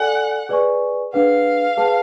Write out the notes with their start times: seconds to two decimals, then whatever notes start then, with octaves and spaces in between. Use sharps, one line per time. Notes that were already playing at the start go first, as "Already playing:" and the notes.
Already playing: A4 D5 F#5 G#5
0.49 G#4 B4 D5 G#5 C#6
1.13 D4 G#4 B4 F5 F#5
1.77 G#4 B4 F#5 A5